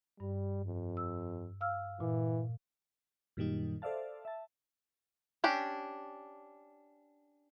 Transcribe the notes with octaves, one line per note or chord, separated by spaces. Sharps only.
G2 G3
F2
E6
F5 E6 F6
A#2 E3
F#2 A#2 D#3 G3 D#4
A4 C5 D5 E5 F5 A5
E5 A5
C#4 D4 G4